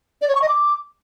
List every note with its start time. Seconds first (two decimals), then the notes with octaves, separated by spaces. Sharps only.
0.22 D5
0.28 C#5
0.35 C#6
0.42 D#5
0.49 D6